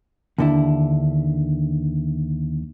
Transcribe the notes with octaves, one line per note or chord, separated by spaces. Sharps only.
D#2 D3 E4